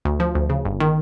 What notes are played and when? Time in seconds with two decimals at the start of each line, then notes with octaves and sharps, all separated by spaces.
0.05 D2
0.20 F3
0.35 D2
0.50 C#3
0.65 G1
0.80 D#3